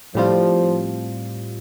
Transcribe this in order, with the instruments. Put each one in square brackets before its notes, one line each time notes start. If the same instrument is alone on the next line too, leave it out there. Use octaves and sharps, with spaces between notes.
[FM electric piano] A2 G3 C4 F4 [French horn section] F3